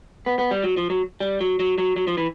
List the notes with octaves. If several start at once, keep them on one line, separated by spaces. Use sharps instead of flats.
B3
B3
G3
F#3
F3
F#3
G3
F#3
F#3
F#3
F#3
F3
E3